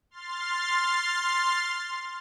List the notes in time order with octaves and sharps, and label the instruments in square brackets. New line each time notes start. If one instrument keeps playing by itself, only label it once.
[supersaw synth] C6 F6 A6 C7